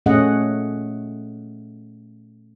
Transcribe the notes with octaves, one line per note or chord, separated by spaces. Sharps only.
A#2 A3 C#4 G#4 D#5 F#5